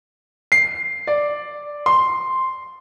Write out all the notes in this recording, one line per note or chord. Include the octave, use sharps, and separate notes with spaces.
C7
D5
C6